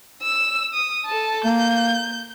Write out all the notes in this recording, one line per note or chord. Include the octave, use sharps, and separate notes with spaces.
E6 E7
D#6
A4 A5
A#3 G6